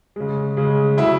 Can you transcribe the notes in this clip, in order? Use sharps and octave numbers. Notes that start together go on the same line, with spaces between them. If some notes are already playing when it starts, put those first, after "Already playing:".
C#3 G#3
C#3 G#3
C#3 F#3 E4 E5